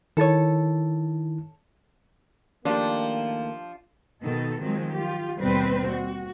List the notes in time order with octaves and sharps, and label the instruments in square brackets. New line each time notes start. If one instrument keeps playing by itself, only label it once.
[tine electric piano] D#3 E4 A6 [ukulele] A4 C#5
[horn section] D#3 A3 A#3 [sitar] F3 [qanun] D4 G4
[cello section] B2 D#3 D#4 A4
D#3 F3 F#3 G#3 C4
F4 G4
D#2 B2 G3 C4 B4 C5
F#4